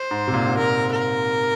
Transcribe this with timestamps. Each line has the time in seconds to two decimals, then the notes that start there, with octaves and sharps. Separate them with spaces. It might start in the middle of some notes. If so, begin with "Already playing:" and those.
Already playing: C5
0.11 G#2
0.28 C3
0.34 A#2
0.47 G#2
0.57 A#2 A#4
0.92 A#4